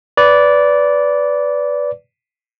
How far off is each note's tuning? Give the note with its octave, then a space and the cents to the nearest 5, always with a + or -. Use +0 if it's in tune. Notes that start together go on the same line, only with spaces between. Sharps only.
B4 +0 D5 -15